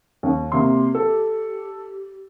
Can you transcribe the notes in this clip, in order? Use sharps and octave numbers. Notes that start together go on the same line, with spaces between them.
D#2
C3 A#3 G4 C6
A4